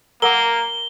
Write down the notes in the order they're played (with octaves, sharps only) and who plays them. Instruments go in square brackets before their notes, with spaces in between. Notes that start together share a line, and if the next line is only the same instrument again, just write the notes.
[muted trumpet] A#3 [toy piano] A#4 F#5 D6 [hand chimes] A#5 [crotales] G7